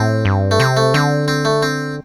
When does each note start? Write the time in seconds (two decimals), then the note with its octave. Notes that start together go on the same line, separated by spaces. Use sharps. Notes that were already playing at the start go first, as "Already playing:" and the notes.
Already playing: A2 C4
0.25 G2
0.51 A3
0.60 C3 C4
0.77 A3
0.94 D3 C4
1.28 C4
1.45 A3
1.63 C4